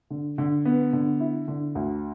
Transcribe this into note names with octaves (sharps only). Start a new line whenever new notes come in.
D3
D3
B3
D3
E4
D3
D2